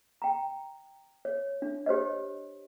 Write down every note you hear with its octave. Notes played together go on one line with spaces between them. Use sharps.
G5 A#5
C#5
D4
G4 C5 C#5 D#5